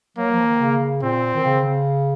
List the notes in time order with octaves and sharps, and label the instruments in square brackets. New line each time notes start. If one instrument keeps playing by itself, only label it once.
[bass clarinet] F#3 [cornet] A#3
[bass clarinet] F3
D#3
C#3
[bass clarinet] A#2 [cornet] C4
[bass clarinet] D#3
C#3